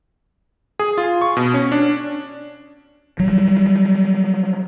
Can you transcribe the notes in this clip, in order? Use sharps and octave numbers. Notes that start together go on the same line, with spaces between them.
G#4
F4
C#6
B2
C#4
D4
F#3 G3